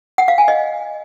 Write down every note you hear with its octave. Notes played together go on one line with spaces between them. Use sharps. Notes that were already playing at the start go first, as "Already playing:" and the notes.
F#5
F5
G#5
D#5